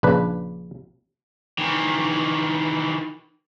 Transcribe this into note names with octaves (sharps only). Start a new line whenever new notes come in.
A#1 C#3 D4 B4
D#3 E3